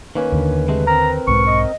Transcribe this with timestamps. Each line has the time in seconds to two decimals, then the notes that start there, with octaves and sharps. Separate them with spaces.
0.15 D#3 A#3 C#4 B4
0.32 D#2 D3
0.68 C3 G#3 A3
0.87 C4 A#4 A#5
1.27 B1 G#2 C#6
1.47 D#5